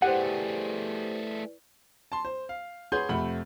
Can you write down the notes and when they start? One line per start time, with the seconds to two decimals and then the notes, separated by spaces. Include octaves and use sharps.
0.02 A3 E4 G4 G#4 B4 C5 D5 F#5
2.12 A5 C6
2.25 C5
2.49 F5
2.92 G#4 B4 C#5 F#5 C6 G6
3.09 F2 C3 A3 F#5 B5